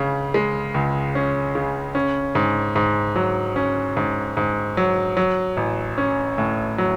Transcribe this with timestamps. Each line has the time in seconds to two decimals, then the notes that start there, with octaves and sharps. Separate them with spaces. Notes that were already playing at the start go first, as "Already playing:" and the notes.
Already playing: C#2 C#3 C#4
0.34 G#3
0.74 C#2
1.15 C#4
1.55 C#3
1.95 C#4
2.35 G#2
2.75 G#2
3.16 F#3
3.56 C#4
3.97 G#2
4.37 G#2
4.77 F#3
5.17 F#3
5.57 A1
5.98 C#4
6.38 A2
6.78 F#3